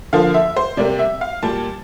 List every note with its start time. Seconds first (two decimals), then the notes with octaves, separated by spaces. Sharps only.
0.13 D3 F3 A#3 F5
0.34 E5
0.57 C5
0.77 C3 G3 A#3 D5
0.99 E5
1.21 F5
1.43 A#2 G3 A#3 A5